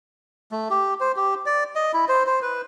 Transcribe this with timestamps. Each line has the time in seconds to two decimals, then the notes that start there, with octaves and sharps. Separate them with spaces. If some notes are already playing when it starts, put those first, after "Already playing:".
0.52 A3
0.70 G4
1.00 C5
1.16 G4
1.46 D5
1.76 D#5
1.94 E4
2.09 C5
2.26 C5
2.42 B4